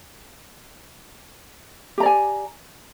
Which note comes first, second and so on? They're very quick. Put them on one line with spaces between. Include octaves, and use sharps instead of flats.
G4 A#5 D5 G#5